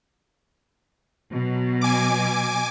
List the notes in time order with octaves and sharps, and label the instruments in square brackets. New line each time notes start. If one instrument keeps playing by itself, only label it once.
[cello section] B2 F#3
[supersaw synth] G#5 D6